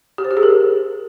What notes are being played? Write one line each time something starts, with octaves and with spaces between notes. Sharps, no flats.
G4
C5
G4
G#4
A#4